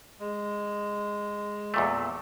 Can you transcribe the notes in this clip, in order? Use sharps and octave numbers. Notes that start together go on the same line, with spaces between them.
G#3
E2 A#2 A3